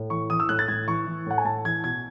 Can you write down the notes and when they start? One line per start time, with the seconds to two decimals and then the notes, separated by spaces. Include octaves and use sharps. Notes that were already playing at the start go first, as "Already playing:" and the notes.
Already playing: A2
0.10 E3 C#6
0.30 E3 D#6
0.40 E6
0.49 A2 F#6
0.59 A6
0.68 A2 G#6
0.87 E3 C#6
1.07 E3
1.26 A2 F#5
1.38 G#5
1.45 A2 A5
1.65 E3 G#6
1.84 B2 G#6